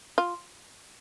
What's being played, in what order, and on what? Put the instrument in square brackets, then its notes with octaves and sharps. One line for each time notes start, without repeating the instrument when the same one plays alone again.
[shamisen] F4